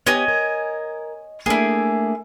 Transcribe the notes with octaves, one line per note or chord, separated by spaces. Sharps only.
B3 G4 C#5 D#5 G#5
A#4
A3 A#3 D4 E4 G#4